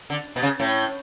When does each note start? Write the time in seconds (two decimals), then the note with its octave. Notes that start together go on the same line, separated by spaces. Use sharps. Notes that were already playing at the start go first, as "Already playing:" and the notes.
0.10 D3
0.36 B2
0.42 C#3
0.60 A2